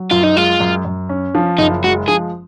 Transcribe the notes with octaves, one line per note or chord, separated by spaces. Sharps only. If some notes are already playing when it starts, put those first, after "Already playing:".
Already playing: F#3
F#2 F4
D#4
G#3 F4
F#2
F#2
C#4
F3
F#1 D#4
G#3 F#4
F3 G#4